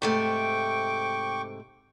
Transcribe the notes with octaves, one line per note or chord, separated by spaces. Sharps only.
G#2 C3 A3 G5 C#6 D6